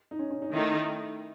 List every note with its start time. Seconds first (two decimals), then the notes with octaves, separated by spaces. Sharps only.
0.11 D#4
0.19 C#4
0.30 C#4
0.42 D#4
0.52 D#3 A3 D#4 E4